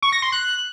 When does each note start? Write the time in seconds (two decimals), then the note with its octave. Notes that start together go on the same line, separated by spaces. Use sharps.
0.02 C#6
0.12 A#6
0.22 C6
0.32 F#6